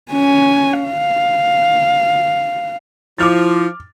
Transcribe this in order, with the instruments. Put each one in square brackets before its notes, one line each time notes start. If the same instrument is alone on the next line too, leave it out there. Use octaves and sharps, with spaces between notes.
[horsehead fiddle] C#4 G#5
F5
[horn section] F3 [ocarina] E4 [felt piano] D6 F6 A6